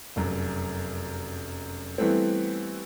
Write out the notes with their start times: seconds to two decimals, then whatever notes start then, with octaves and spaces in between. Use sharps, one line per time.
0.16 F1 F#2
1.98 E3 G3 A3 B3 C4